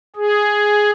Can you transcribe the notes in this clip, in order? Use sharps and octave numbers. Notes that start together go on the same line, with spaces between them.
G#4